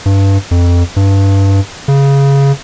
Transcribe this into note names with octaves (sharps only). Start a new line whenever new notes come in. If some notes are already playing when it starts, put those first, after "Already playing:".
G2
F2
G2
C#3